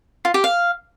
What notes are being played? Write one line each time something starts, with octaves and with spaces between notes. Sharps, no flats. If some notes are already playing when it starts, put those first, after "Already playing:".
F4
G4
F5